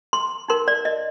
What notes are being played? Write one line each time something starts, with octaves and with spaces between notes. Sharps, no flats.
C6
D#4 A#4 C6
D5
D#5